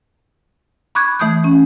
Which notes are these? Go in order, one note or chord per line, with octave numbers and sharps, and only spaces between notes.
B5 C#6 D6 F#6 G#6
E3 A3 D#6 G6
C#4